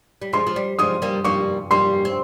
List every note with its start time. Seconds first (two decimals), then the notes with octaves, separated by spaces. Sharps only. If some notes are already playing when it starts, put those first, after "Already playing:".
0.22 G3
0.33 F3 G#3 C6
0.47 F3
0.56 G3
0.79 F3 G#3 D#6
1.02 G3 A#3
1.24 G3 A#3 C#6
1.71 G3 A#3 C6
2.05 C4